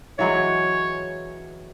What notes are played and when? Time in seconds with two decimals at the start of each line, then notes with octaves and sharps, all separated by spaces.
0.19 E3 F#3 G#3 C#5